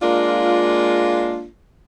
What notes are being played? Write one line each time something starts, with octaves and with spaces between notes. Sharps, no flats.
G#3 A#3 D4 F4